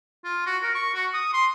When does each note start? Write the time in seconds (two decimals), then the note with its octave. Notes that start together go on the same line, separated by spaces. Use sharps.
0.24 F4
0.46 F#4
0.63 A#4
0.75 C#6
0.94 F#4
1.14 D#6
1.33 C6